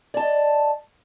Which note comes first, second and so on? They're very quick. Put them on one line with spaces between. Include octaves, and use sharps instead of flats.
D5 A5 D#5